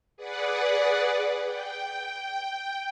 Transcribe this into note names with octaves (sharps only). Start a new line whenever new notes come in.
G#4 B4 D5 F#5
G5